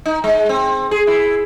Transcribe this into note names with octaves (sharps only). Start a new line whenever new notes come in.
D#4
G#3
C4
G#4
E4